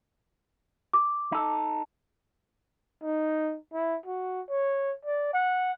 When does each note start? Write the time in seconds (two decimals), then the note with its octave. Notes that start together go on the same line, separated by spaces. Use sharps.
0.93 D6
1.32 D#4 A4
3.03 D#4
3.73 E4
4.06 F#4
4.50 C#5
5.05 D5
5.33 F#5